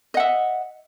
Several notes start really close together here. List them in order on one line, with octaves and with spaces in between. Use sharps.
D#5 F#5 E5